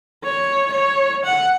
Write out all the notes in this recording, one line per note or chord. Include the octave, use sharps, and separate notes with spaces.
C#5
C#5
F#5